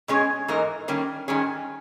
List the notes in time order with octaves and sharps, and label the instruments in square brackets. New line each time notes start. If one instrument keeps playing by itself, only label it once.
[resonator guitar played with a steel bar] B2 G#3 C#4 G#4
G#2 E3 A#3 D#4 A#4
D#3 G3 A#3 C#4
G#2 D#3 G3 C#4 G#4